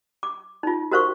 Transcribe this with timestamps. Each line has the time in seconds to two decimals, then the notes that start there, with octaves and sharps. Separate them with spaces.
0.23 D6
0.63 D#4 F4
0.91 F#4 A#4 C5 F5 C#6